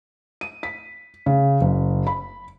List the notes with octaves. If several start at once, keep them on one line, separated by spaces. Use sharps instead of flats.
D#7
B6
C#3
F#1
B5